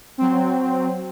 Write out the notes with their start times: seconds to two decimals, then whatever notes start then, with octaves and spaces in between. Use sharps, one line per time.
0.18 F#3 C4